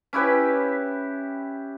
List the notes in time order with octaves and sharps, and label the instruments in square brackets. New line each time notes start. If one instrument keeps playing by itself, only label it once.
[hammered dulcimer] C#4 E4 G4 B4